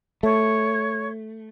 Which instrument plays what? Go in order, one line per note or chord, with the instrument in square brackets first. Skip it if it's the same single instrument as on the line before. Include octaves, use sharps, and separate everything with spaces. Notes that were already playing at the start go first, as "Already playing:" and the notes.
[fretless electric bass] A3 [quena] C#5